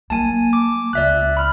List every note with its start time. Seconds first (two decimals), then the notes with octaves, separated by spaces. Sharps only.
0.10 F#3 A#3 G#5 A5
0.53 D6
0.93 C#2 D5 E5 F#6
1.37 B5 F6